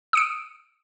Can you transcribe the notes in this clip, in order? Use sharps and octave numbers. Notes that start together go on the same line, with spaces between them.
D#6 C#7 D7